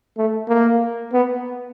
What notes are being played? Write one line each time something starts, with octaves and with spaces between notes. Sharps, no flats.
A3
A#3
B3